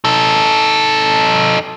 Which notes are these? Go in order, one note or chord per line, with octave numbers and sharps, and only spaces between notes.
D#4 A4